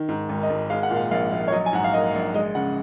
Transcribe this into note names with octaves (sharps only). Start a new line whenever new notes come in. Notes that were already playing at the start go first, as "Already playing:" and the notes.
Already playing: D#3
G#2
G#1
D#5
G#1
G#3 F5
F#5
A#2
F5
A#1 F5
A#1
C#5
F#3 D#5
G#5
G#2 F#5
F5
A#3 D#5
A#1
G#3 D#5
C#3 F#5